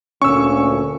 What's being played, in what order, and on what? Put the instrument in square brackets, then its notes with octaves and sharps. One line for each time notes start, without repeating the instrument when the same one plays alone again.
[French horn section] D2 A#2 D3 [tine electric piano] C#4 [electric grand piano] C#6 E6